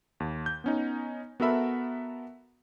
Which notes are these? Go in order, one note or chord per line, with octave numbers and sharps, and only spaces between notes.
D#2
G6
B3 C#4 D#4
B3 F#4 A4 A#4 E5 B5